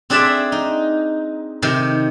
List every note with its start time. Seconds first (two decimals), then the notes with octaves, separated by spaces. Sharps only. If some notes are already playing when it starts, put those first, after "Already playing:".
0.10 C4 D4 G#4 D5 E5 A5
0.52 D#4
1.62 C3 D#3